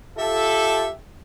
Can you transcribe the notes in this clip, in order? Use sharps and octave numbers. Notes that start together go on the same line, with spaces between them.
F4 G4 A4 E5